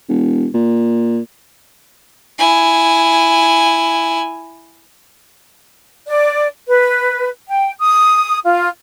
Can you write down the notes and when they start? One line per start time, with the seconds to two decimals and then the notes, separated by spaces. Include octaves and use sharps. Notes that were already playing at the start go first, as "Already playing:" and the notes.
0.09 E1
0.54 A#2
2.39 E4 G#5
6.08 D5
6.68 B4
7.48 G5
7.79 D#6
8.44 F4